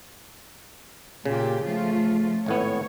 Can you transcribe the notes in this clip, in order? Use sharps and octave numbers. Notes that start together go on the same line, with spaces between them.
A#2 C#3 G4
F3 A3 F4
G#1 A2 B3 C#5